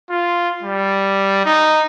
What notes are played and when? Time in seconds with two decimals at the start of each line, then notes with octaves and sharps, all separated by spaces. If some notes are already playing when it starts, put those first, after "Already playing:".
0.10 F4
0.63 G3
1.45 D#4